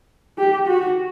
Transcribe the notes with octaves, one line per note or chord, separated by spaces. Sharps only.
G4
F#4